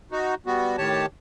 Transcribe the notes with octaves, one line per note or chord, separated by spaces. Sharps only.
D#4 F#4
G3 B3 F#4
A2 D#3 G4 C#5 A5